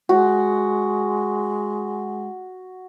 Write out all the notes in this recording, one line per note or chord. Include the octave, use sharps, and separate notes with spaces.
G#3 F#4